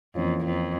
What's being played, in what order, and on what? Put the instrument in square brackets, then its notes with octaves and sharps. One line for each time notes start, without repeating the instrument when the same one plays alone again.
[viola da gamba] F2 [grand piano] E3 A#3 C#4 F4
[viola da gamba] F2